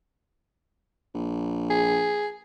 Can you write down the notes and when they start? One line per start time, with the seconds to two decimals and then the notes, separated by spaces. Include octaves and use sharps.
1.15 A#1
1.70 G#4